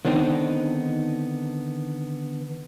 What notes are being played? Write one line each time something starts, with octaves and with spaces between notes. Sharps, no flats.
D3 D#3 B3 C4 D4 D#4